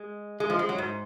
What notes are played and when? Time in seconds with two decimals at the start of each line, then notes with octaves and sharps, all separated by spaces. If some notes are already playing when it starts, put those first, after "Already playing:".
Already playing: G#3
0.40 G#3
0.50 F3
0.59 G#3
0.69 F#3
0.78 G#2